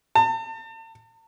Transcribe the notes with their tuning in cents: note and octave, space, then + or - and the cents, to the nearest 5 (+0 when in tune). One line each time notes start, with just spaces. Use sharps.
A5 +40